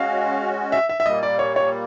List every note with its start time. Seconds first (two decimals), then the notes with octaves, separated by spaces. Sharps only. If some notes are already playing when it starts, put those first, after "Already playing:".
Already playing: G#3 C#4 F#4 F5
0.72 E5
0.89 E5
1.00 E5
1.06 A#2 G3 A#3 D#5
1.23 D5
1.39 C#5
1.56 C#5